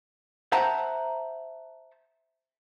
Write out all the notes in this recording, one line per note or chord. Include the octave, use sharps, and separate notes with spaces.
C5 E5 F#5 A5 A#5